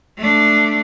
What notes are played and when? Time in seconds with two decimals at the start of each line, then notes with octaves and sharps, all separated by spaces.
0.18 A3 D4